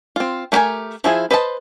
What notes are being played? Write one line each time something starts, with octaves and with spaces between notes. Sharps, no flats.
C4 F4
A3 A#3 G4 A#4 G#5
F3 E4 G#4 E5
B4 C5 D#5 F5 A5